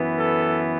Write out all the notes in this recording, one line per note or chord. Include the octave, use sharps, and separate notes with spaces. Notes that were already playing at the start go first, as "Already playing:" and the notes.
Already playing: F#2 E3 B3
A4